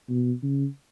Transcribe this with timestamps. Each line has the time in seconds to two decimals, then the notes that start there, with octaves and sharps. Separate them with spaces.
0.09 B2
0.42 C#3